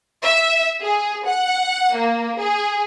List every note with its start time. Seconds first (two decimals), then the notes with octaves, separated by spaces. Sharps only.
0.23 E5
0.82 G#4
1.27 F#5
1.95 A#3
2.39 G#4